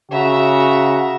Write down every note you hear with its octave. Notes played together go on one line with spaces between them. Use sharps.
C#3 F#4 E5 A#5